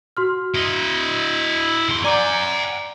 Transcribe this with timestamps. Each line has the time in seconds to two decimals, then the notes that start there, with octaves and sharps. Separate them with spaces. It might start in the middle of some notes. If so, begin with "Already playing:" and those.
0.17 F#4 C6 F6
0.55 E4 D#5
1.89 E2 C6
2.04 D5 F#5 G#5 A#5 D6